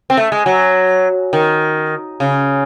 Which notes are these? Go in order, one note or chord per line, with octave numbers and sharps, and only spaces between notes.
C4
A3
G#3
F#3
D#3
C#3